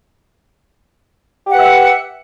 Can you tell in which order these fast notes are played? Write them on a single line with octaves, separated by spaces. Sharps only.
G4 F#5 B4 E5